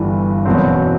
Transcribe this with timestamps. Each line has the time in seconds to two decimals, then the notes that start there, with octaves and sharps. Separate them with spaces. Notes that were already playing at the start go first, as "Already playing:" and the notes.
Already playing: G1 G2 E3
0.45 F#1 E2 B2 F#3 C4